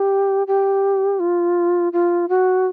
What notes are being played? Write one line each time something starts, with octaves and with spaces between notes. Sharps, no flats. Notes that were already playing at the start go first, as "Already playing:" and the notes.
Already playing: G4
G4
F4
F4
F#4